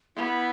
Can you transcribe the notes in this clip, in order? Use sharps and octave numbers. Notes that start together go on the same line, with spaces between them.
B3 E4